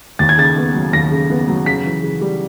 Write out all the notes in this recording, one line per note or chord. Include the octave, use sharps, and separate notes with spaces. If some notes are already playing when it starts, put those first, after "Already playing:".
D#2 A6
G#6
C#3 A6
B3
F#3
D#2 A#6
C#3
B3
F#3
C#3 B6
E3
C#3
G3